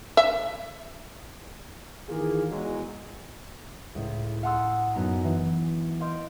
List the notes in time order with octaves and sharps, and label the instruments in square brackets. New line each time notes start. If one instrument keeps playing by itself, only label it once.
[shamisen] E5
[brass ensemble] D#3 E3 A#3 F4 G#4
E2 F#3 G#3
[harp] C#2 A2
F5 F#5 A5 C6 D#6 E6
F#2 B3 D#4 A#5
E3
D#5 F5 C6 G6 D7